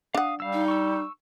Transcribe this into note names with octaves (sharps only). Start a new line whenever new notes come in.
D4 F5 F#5 D#6
G3 F5 E6
D#4
C#6 E6